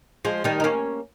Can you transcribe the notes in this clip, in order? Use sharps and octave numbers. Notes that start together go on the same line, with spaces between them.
F3 G#3
D#3 G3
D#4
A#3 C#4